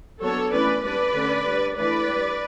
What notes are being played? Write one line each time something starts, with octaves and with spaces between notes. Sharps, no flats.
F#3 B3 D4 A4 C#5
E3 A3 C#4 B4 D5
G3 D4 B4 D5
D3 A3 C#4
G3 D4
E3 A3 D4 B4 D5
G3 D4